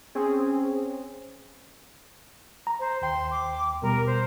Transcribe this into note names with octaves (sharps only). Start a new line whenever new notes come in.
C4 C#4 G#4
A#5
C5
D#2 G5 C6
D6
B2 G3 A#4
C5